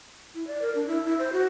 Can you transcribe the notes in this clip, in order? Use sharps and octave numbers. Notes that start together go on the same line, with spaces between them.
E4
D5
A#4
D4
E4
E4
C5
F#4